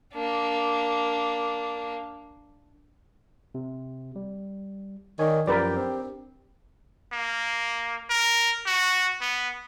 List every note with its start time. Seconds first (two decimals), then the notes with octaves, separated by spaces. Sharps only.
0.13 A#3 D4
3.55 C3
4.16 G3
5.19 D#3 C#5 D5 G#5
5.47 F#2 F3 G4 A#4 B4 D5 G6
5.77 C4 D4
7.12 A#3
8.10 A#4
8.66 F#4
9.21 B3